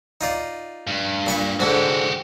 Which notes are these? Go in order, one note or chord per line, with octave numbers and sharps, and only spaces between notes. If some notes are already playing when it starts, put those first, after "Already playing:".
D#4 F4 D5
G2
A#2 B5 C#6
G#2 D3 F#4 G4